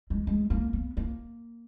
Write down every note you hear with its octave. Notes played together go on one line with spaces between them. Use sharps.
G#3
G#3
A#3
B3
A#3